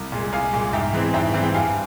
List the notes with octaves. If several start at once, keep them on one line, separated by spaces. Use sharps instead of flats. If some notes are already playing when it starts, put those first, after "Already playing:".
Already playing: C2
A#2 G#3
C2 F5 G#5
A#2 G#3
G#2 E5 G5
E3 G#3 C4
G#2 E5 G5
E3 G#3 C4
G5
G2 F5 G#5